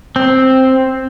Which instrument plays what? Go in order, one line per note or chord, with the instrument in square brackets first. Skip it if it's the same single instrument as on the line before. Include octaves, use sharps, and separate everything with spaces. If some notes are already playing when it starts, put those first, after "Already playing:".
[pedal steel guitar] C4